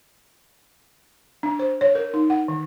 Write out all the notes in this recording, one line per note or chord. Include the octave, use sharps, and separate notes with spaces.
D4
C5
C#5
A#4
D#4
F#5
D#3